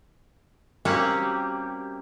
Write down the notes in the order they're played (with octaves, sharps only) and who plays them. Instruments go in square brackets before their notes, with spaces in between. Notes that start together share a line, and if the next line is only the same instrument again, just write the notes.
[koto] G3 A#3 C4 C#4 F#4 G4